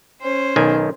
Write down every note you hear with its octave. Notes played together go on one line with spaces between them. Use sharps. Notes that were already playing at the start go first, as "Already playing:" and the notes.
C#4 C5
B1 D#3 G#5